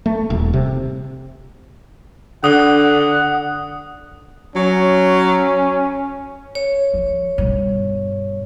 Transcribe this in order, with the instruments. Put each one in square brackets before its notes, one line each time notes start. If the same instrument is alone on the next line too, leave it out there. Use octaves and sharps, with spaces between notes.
[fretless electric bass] A3
D#1
C3
[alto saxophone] D3 [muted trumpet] F#5 [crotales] D#6
[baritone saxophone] F#3 [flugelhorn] C#4
[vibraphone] C#5
[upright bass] F3
G2 B2